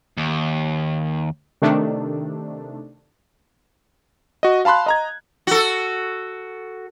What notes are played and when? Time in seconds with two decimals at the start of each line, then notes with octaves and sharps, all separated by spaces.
0.17 D#2
1.62 C3 D#3 A3 D4
4.43 F#4 D#5
4.65 F5 A5 B5 C6 F#6
4.86 D#5 A#5 G#6
5.47 F#4 A4